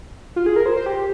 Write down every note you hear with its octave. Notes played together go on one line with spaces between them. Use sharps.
F4
G#4
A#4
C5
C5
G4